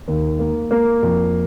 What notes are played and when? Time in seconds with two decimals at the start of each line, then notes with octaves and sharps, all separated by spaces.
0.08 D#2
0.39 A#3
0.71 A#3
1.03 F2